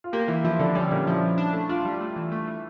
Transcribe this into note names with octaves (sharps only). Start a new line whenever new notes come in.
F4
A#3 G4
E3 E4
F3 E4
D3 D4
G3 C#4
A#2 D4
F3 E4
A#2
D4
A3
D4 F4
G3
A3
E3
A3
E3